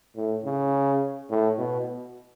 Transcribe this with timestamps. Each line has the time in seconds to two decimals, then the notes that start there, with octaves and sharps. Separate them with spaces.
0.16 A2
0.45 C#3
1.30 A2
1.59 B2